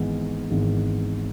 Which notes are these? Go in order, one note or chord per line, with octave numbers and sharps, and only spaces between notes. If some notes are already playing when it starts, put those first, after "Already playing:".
Already playing: G#1 G#2 E3 G#3 B3
G#1 G#2 E3 G#3 B3